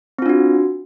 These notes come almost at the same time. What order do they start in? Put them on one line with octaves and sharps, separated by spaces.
C4 F4 D4 F#4